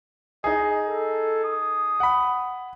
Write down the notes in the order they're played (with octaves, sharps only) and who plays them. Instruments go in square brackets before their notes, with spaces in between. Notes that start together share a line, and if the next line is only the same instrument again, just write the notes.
[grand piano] D#4 G#4 [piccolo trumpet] D#5
[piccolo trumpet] A4
D#6
[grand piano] F#5 B5